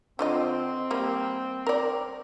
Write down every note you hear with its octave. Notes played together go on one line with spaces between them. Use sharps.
D3 C4 F4 D#5
G3 A#3
A#4 D5